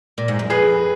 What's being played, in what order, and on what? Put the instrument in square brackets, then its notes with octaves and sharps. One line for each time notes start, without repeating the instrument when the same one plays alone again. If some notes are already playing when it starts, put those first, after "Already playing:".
[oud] A#2
G#2
F#2
[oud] F2 [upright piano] G#4 B4